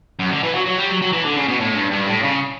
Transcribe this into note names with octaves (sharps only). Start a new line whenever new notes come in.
F#2
D3
E3
F#3
F#3
G3
F#3
F#3
E3
D3
C#3
B2
A2
G2
G2
A2
C#3